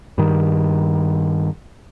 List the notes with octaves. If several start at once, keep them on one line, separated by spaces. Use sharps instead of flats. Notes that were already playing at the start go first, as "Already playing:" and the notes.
G2 D#3